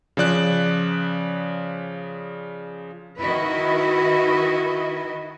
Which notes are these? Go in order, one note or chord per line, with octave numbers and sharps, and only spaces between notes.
C#3 F3 D5 F#6
D#3 E4 F#4 B4 D#5